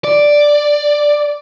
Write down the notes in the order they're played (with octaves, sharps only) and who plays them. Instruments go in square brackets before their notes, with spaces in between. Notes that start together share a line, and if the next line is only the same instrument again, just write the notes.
[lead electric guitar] D5